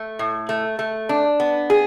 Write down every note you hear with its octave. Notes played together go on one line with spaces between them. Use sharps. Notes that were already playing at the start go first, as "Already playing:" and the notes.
Already playing: A3
A2
A3
A3
D4
B3
G#4